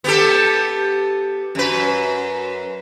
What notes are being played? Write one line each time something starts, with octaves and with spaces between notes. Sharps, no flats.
B3 G4 A4
F#2 B4